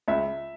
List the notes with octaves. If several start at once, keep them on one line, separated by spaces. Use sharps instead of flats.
C#2 E5